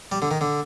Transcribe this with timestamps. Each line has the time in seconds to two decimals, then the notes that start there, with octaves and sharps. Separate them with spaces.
0.12 G3
0.22 D3
0.31 D#3
0.41 D3